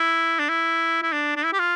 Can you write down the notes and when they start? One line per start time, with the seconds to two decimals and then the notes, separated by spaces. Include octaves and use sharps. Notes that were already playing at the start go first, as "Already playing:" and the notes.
Already playing: E4
0.39 D4
0.49 E4
1.03 E4
1.13 D4
1.36 D4
1.45 E4
1.53 G4
1.59 F4